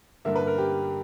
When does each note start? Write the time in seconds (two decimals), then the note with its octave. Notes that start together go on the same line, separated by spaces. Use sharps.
0.25 G2 D3 A#3 E5
0.36 B4
0.47 A#4
0.58 G4